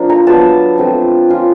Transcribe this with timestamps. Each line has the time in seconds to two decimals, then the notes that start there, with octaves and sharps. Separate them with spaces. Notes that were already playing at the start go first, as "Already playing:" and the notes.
Already playing: F3 A#3 D4
0.10 A#5
0.27 F#3 B3 D4 A5
0.78 F3 A3 C4
1.29 A#3 C#4 F4